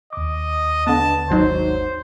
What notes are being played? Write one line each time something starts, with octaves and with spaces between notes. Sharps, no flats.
D#2 D#5 D6
D3 B3 A5
G#1 F#3 D#4 C5